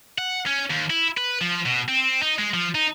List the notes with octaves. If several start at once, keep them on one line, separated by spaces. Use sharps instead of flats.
F#5
C#4
D#2
E4
B4
F3
B2
C4
D#4
G#3
F3
D#4